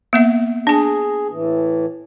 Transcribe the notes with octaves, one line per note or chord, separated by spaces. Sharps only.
A#3 B3 E5
D4 G#4 A5
A2 E3